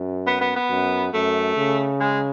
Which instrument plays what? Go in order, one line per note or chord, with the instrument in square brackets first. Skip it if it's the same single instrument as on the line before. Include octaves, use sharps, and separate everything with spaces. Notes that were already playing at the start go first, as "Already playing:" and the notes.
Already playing: [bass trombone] F#2
[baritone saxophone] B3
B3
B3
[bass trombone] F#2
[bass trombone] F#2 [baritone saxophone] A3
[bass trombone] C#3
[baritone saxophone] G#3